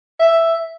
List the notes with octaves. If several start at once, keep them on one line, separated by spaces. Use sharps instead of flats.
E5